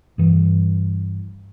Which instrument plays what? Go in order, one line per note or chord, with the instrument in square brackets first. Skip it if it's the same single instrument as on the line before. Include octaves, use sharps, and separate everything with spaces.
[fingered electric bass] G2 E3